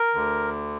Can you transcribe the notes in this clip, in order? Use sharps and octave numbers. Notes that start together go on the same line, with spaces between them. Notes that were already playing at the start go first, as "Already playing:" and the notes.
Already playing: A#4
D2 D3